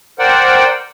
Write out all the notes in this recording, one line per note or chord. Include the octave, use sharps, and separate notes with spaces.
A#4 C5 D5 F#5 G5